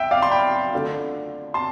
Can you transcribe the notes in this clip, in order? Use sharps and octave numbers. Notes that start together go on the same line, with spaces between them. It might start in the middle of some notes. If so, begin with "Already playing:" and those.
Already playing: C2 E5 G5
D5 F5
C6
G5 B5
D3 A3 D4 F4
A5 C6